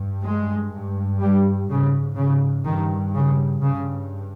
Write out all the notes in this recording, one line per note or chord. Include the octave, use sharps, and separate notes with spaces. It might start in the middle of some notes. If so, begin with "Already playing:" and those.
Already playing: G2
G#3
G2
G3
G#2 C#3
C#3
G2 D#3
C#3
G2 C#3